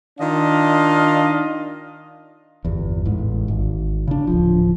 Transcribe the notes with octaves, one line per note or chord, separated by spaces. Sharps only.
D#3 D4 F4 D#5 F5
G1 E2
A1 G#2
G#1
C#3 D4
D1 G1 F3